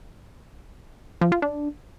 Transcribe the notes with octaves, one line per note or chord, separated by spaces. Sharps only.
F3
F4
D4